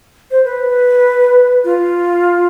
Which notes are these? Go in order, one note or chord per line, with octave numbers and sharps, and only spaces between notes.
C5
B4
F4